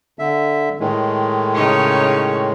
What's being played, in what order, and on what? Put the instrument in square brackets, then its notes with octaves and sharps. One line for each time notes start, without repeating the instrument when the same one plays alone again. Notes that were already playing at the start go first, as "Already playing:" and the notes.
[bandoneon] D3 E5
A2 D#3 G#3
[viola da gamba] C#3 D#4 C#5